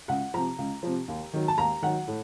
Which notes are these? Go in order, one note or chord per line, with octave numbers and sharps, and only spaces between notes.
C#2 F#5
C3 F3 A#5
C#2
C3 F3
D#2
D#3 F#3
A5
D#2 A#5
D#3 F#3 F#5
A2